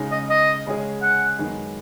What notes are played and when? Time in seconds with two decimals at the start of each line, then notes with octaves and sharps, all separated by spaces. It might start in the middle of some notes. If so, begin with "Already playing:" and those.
Already playing: C#3 G#3 D#4
0.12 D#5
0.30 D#5
0.66 C#3 G#3 C#4 G#4
1.02 F#5
1.38 F#2 D#3 G#3 B3